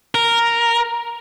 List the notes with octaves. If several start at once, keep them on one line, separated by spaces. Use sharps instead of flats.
A#4